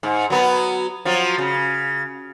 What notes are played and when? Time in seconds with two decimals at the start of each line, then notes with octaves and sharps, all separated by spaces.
0.03 G#2
0.30 F#3 B3
1.05 F3 F#3
1.38 C#3